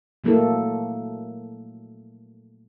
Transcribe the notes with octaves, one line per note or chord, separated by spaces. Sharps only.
A#2 F#3 A3 A#3 E4 A4